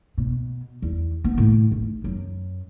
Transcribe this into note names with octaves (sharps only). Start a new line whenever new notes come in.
B2
E2
B3
A2
G#1
F#2